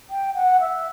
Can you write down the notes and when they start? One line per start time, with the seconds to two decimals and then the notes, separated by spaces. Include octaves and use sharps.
0.10 G5
0.34 F#5
0.60 E5